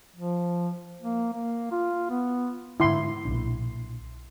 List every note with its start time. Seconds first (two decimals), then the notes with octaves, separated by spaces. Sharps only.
0.16 F3
1.02 A#3
1.33 A#3
1.71 F4
2.10 B3
2.80 G#2 D3 E4 C6
3.25 B1 A#2 D4